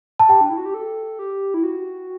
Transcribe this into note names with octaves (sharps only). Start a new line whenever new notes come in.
A5
G4 G5
D4
E4
F#4
G4
A4
G4
E4
F#4